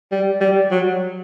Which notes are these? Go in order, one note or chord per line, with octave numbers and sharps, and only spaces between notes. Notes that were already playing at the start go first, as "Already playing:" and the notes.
G3
G3
F#3